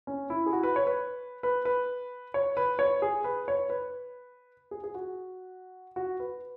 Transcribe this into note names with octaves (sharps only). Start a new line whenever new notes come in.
C#4
E4
G#4
F#4
B4
C#5
B4
B4
B4
C#5
B4
C#5
G#4
B4
C#5
B4
G#4
G#4
F#4
F#4
B4